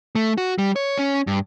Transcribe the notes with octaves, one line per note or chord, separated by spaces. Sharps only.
A3
F#4
G3
C#5
C#4
G2